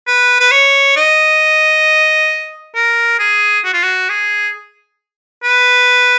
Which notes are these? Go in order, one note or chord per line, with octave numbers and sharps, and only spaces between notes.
B4
B4
C#5
D#5
A#4
G#4
F#4
F4
F#4
G#4
B4